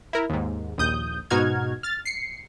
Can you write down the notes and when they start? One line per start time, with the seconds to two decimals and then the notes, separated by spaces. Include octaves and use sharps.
0.13 E4 A#4
0.30 D#2 G#2
0.78 A#1 D#2 D#6 G6
1.30 G#2 B2 D#4 F#4 F6 G#6
1.83 F6 A6
2.05 C7 C#7